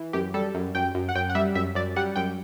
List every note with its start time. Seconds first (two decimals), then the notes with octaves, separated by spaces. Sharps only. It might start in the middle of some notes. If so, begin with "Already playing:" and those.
Already playing: E3
0.13 F#2 G4
0.34 G3 A4
0.54 F#2
0.75 F#2 G5
0.95 F#2
1.09 F#5
1.15 F#2 G5
1.30 F#5
1.35 G3 E5
1.55 F#2 E5
1.75 F#2 D5
1.96 G3 F#5
2.16 F#2 G5